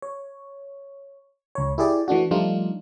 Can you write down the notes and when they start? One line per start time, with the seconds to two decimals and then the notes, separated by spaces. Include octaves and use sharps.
0.02 C#5
1.55 C#2 C#5
1.78 E4 G4 G#4 D5
2.08 E3 A3 D4 F#4
2.31 F3 G3 A3 D4 D#4 F4